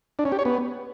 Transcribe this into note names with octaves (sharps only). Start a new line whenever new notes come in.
D4
C#4
G4
C#5
B3